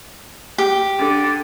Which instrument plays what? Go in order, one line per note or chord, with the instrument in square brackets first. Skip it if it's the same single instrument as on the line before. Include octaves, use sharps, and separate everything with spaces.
[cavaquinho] G4
[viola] D3